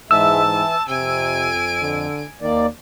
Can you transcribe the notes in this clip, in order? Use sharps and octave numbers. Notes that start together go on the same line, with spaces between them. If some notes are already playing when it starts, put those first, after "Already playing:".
G#2 E3 G#3 E5 A5 E6
E3
F2 C3 G#5 D7
D3
D#2 D#3 A#3 D5